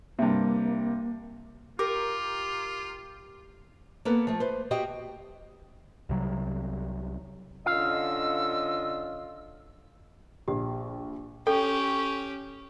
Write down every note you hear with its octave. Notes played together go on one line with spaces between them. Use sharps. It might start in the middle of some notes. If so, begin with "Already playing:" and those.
G2 C3 A#3
F4 G4 A#4 D6
A#3 B3 A4 B4
F3 A3
B4 C5
F#4 G4 D#5 F5 G5
C2 C3 F#3
D3 C#4 F4 D#5 F5 E6
A#1 G4
C#4 G4 A4 G5